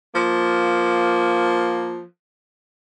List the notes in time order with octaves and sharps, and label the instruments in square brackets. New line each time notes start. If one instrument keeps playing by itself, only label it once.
[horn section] F3 A#3